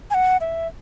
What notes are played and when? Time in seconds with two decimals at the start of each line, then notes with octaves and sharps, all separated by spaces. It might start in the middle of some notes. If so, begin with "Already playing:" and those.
0.10 G#5
0.14 F#5
0.41 E5